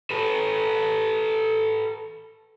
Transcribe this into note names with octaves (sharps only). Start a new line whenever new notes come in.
A4 B4